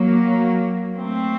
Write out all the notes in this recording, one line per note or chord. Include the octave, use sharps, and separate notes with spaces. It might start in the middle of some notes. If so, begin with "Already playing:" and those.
Already playing: F#3 A#3
A3 C4